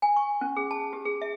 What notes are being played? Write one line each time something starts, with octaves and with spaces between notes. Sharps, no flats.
G#5
C#6
C#4
G#4
A5
G4
G#4
E5